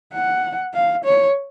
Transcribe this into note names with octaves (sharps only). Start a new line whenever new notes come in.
F#5
F5
C#5